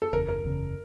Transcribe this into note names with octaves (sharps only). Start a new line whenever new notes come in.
A4
F#1 E2 C#3 A#4
A#4
F#1 E2 C#3